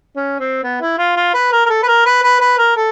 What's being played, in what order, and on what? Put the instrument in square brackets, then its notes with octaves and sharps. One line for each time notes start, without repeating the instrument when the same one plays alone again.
[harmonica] C#4
C4
B3
E4
F4
F4
B4
A#4
A#4
A4
B4
A#4
B4
B4
B4
A#4
A4